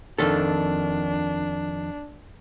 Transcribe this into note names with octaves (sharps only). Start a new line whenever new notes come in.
F2 D#3 D4 A4